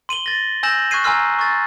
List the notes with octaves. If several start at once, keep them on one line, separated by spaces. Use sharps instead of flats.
C6 D#7 F#7 G7
A6 A#6
G#5 E6 G6 A#6 E7 F#7
C#6 F#6 G#6 C7 D#7
G#5 A#5 C6 E6 F6 C7
C#6 A6